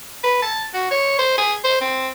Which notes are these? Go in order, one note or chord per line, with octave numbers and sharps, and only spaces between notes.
B4
A5
F#4
C#5
C5
G#4
C5
C4